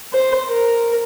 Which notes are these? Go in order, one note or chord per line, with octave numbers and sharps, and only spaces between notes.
C5
A#4